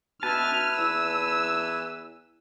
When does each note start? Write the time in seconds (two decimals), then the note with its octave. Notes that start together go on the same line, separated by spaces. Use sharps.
0.23 B2 B4 E5 G#5 A5 F6
0.78 E2 E6